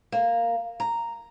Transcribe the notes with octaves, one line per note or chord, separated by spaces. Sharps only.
A#3
A#5